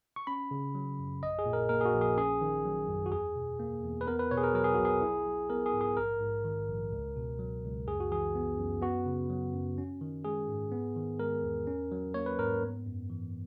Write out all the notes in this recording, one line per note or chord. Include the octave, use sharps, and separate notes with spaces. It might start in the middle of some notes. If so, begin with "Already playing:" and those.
C#6
C#4 B5
C#3
F#3
F#2
A#1 D#5
G#4
A#2
A#4
A#3 A#4
G#4
F#4
A#1
G#4
C#4 G#4
D#3
F#3
F#2
F#4
E2 G#4
B2
A#3
E2
B4
B3 A#4
B4
B2 C#5
G#4
A#4
F#3 A#4
G#4
B1 F#4
G#4
E4
F#3
B3 A#4
G#4
G#2
G#4
A#1 A#4
G#2
D#3
A#1
C#2
B2
F#3
C#2
F#2 G#4
F#4
E3 G#4
B3
F#2
B3 F#4
C#3
F#3
F#2
C#4
D#3
G#3 G#4
G#2
B3
D#3
G#3 A#4
E2
C#4
F#3
A#3 C#5
B4
G#2 A#4
B3
F#2
E3